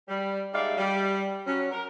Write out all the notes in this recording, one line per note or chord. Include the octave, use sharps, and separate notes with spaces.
G3
G3 G#3 D#4 D5 E5 F5
G3
F#3 C#4
A#4